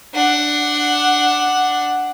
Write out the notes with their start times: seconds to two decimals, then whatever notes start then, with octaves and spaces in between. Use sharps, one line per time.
0.14 D4 F#5